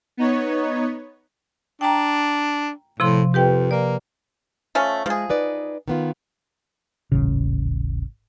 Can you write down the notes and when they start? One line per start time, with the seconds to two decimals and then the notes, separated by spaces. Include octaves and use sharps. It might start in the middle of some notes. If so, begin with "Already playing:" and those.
0.17 B3 D#4 C#5
1.81 D4 G5 A#5
3.00 A2 C3 F3 C6
3.34 F2 G4 B4 G5
3.71 A#3 D5
4.75 F3 A3 C#4
5.06 F3 G#3 G#4
5.29 D#4 B4 D5
5.88 D#3 B3 F4
7.12 D#1 A1 C#3